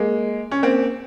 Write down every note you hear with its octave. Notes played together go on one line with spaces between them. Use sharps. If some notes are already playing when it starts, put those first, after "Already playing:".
Already playing: G#3 A#3
C#4
A#3 C4